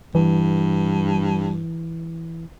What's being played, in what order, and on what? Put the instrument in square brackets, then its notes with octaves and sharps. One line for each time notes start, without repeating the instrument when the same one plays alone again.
[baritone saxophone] G2 [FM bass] E3